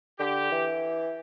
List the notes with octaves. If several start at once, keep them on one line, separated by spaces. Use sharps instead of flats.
D3 G4
E3